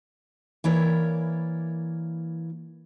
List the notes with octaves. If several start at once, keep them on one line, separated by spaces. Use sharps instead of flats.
E3 A#3 E4 A#4 C#5 D5